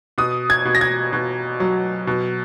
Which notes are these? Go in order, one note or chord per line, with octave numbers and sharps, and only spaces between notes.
B2 D#6
G#6
B2
A#6
G#6
B2
F#3
B2